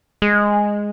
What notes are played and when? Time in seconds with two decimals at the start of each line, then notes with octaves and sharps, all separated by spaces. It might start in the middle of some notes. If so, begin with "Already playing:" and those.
0.22 G#3